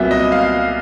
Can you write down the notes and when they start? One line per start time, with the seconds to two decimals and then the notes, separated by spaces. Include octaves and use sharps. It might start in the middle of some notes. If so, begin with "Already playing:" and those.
Already playing: C2 A#2 F#3 B3 E5
0.11 D#5
0.32 F5